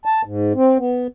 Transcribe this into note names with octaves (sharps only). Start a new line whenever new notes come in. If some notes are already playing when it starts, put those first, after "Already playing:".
A5
G#2
C4
B3